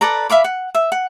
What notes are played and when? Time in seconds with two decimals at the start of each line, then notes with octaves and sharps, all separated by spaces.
0.01 A4 B4 D5 A#5
0.30 E5 F5 B5 D6
0.44 F#5
0.75 E5
0.92 F#5